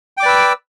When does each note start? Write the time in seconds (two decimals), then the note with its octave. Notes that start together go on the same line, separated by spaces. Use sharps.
0.17 G5
0.20 D6
0.23 D5
0.25 B4
0.28 E6